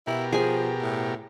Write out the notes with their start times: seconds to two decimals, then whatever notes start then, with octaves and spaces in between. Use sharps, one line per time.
0.07 B2 E4 G4 A#4
0.32 F3 G#4 G#5
0.82 A2